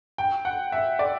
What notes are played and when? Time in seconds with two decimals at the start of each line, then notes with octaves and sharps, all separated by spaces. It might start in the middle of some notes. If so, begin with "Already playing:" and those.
0.18 G5
0.45 F#5
0.72 E5
0.99 D5